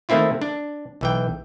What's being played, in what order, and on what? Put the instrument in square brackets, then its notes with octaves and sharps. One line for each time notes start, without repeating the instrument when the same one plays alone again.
[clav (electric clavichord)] D#3 A3 A#3 C4 E4 F4
D4
B1 E3 G5